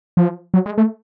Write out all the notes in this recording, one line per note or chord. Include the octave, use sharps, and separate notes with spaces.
F3
F#3
G#3
A3